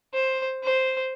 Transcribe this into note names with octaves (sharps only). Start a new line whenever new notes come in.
C5
C5